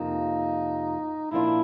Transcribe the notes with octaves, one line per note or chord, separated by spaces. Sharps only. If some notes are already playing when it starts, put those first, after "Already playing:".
Already playing: F2 C3 F3 A#3 D#4
A#2 F3 A#3 D4 E4 F4